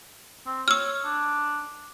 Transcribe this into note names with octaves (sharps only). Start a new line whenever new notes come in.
C4
C#5 E6 F6
D4